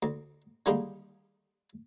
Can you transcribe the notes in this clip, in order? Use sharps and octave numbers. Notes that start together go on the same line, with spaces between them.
D2
D3 D#3 G3 G#3 A#3 D#4